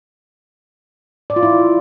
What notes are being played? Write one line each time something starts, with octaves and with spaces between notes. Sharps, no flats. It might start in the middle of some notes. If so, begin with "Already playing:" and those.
D5
F4
E4